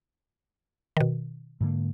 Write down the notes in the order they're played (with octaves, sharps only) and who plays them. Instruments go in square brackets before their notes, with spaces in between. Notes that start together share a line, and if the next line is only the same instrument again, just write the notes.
[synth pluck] B2 D#3
[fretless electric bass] G#2 D3 A#3